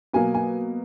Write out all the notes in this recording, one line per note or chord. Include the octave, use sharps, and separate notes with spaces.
B2 F#3 A#3 G#5
G#5